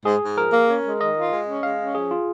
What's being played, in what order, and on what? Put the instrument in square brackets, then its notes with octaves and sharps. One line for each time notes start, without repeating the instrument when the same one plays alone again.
[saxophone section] G#2 [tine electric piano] G#4
[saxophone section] G#2
[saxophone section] F3 [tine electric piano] A#4
[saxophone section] A#3
C#4
G#3
[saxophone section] D#3 [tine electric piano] D#5
[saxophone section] F4
G#3
C#4
[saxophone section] G#3 [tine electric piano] F5
[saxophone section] C#4
[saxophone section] F3 [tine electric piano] G#4
[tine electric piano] F4